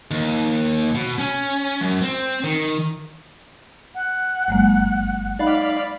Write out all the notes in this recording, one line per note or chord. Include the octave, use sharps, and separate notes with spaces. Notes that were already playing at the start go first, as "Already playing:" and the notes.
D#2
B2
C#4
F#2
C4
D#3
F#5
G1 F#3 G#3 A#3
D#4 D5 F5 B5